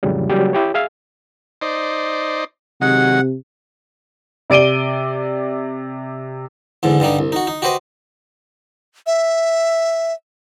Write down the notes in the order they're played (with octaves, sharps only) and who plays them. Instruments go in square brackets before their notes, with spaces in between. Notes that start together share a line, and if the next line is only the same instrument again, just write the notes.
[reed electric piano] F2 A2 C#3 E3 F#3 G3
C#3 F#3 G3 A#3 C#4 G4
E4 G4 C#5
G#4 E5 F5 G#5
[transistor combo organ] D#4 C5 D5
[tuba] C3 [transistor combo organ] D#3 F#3 G#3 [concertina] F#5
[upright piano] C3 D5 D7 D#7 G7
[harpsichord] E2 G#2 D3
G2 D3 G3 D#4
C2
D#4 F#4
D#4
F#4 G4 B4 C5 D#5
[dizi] E5